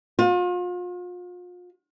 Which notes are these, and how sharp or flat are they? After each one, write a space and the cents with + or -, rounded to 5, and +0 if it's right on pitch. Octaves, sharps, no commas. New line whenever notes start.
F4 +40